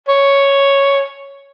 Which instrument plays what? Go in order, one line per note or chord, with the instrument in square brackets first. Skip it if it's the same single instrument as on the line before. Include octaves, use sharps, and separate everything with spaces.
[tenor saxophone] C#5